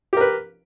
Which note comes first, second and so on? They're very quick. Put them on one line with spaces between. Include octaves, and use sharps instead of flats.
G4 A#4 B4